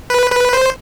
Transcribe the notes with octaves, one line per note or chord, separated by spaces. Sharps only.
B4
B4
C5